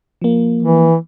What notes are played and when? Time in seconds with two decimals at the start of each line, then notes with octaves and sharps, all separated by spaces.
0.22 F3 A#3
0.63 E3